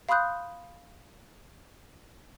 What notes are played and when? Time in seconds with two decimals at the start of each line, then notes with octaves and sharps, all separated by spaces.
0.09 F5 B5 C6 D#6 F#6 G6